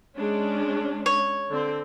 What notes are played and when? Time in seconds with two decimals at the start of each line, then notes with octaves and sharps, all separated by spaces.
0.17 G#3 C#4 D4
1.06 C#5
1.51 D3 C4